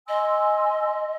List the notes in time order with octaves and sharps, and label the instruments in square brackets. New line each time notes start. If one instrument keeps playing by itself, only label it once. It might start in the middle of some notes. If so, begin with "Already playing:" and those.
[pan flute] D#5 [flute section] G#5 C6 E6